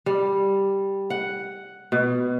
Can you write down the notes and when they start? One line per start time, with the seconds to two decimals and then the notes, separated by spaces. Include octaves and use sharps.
0.06 G3
1.10 F#5
1.92 B2